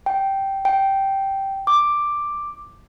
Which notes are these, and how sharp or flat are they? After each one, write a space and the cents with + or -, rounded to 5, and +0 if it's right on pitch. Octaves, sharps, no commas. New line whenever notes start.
G5 -10
G5 -10
D6 +5